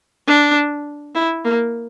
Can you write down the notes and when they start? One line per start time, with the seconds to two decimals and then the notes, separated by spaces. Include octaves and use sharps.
0.27 D4
1.15 E4
1.44 A#3